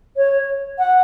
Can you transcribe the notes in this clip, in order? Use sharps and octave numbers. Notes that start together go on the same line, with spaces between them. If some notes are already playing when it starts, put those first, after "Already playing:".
C#5
F#5